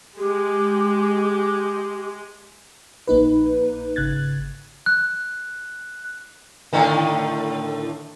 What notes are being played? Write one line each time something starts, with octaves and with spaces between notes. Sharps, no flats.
G#3 G4
A#1 A#3 D#4 B4
G#1 C#3 F#6 G#6 A6
F#6
A2 D3 D#3